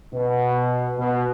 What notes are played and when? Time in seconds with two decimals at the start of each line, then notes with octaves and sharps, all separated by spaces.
0.13 B2
0.98 B2